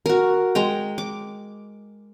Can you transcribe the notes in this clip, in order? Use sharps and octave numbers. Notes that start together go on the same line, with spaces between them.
F#4 A#4
G#3 G5 A#5
D6